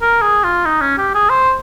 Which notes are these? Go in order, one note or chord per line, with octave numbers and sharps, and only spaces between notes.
A#4
G#4
F4
D#4
C#4
G4
G#4
C5